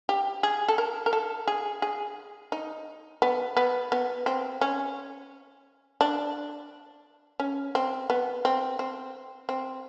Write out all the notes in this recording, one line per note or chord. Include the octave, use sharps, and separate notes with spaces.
G4
G#4
A4
A#4
A#4
A4
G#4
G#4
D#4
B3
B3
B3
C4
C#4
D4
C#4
C4
B3
C4
C4
C4